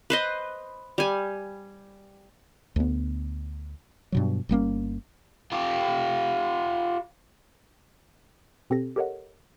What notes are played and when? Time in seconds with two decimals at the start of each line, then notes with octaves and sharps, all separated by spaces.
0.10 B4 C5 D#5
0.98 G3 G#5
2.76 D2 B3
4.12 G2 B2 F#3
4.49 G1 G3 A#3 C#4
5.52 F4 G4
8.70 B2 C4 G4 A4 A#6
8.96 G4 A4 A#4 C#5 D#5 F#5